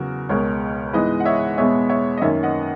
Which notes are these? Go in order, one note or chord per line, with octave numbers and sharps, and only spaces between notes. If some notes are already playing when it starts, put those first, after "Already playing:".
Already playing: E2 C#3 F#3 F#4 A#4
C#2 B2 G#3 A#4 C#5
G#2 E3 G#3 B3 B4 D#5
F#5
C#5 E5
E2 B2 G#3 B3 C#5 E5
C#5 E5
D#5
F#2 D#3 A#3 C#4 C#5 E5
D#5 F#5